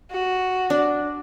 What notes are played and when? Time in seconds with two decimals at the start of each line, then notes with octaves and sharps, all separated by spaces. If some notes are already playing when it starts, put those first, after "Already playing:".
0.12 F#4
0.70 D4